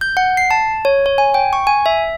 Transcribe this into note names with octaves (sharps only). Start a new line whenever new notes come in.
G6
F#5
C7
A5
C#5
C#5
G#5
G5
C#6
G#5
E5